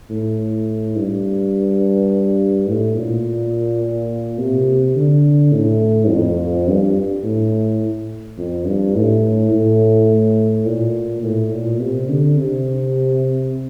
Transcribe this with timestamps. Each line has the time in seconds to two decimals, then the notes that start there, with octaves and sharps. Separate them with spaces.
0.10 A2
0.96 G2
2.68 A2
2.96 A#2
4.39 C3
4.96 D3
5.52 A2
6.10 F2
6.67 G2
7.24 A2
8.38 F2
8.66 G2
8.95 A2
9.52 A2
10.66 A#2
11.23 A2
11.52 A#2
11.81 C3
12.09 D3
12.38 C3